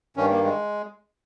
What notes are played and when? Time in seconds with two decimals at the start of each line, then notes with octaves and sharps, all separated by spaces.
0.17 G2 D#3 C#4
0.30 A#3
0.44 G#3